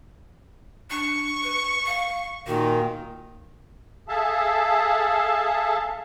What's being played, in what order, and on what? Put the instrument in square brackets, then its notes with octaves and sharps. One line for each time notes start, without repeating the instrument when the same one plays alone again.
[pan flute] D4 [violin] C#6
[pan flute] B4
F5
[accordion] A#2 D#3 [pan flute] F#4
[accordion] G#4 A4 E5 F5 A5